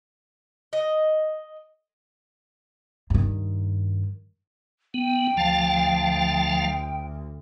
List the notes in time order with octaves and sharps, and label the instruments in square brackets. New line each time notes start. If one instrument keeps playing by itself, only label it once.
[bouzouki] D#5
[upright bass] G2 D#3
[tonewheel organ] B3 [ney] G5
[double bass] D2 [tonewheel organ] F3 F5 A5